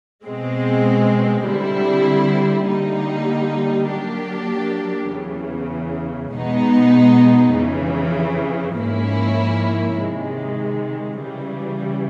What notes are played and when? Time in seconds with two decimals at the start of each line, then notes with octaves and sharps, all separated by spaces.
0.24 B2 G#3 C4
1.46 D3 G3 C4 E4
2.68 D3 G3 A#3 D#4
3.90 F#3 A#3 D4 G4
5.11 E2 C#3 E3
6.34 B2 G#3 B3 D#4
7.55 F2 C#3 E3
8.76 G#2 F3 A#3 C#4 E4
9.98 C3 D#3 G#3
11.20 C#3 E3 G3